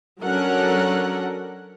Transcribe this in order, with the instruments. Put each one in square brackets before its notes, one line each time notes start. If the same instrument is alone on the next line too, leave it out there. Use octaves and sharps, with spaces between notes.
[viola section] F#3 C#4 D4 A4 A#4 F#5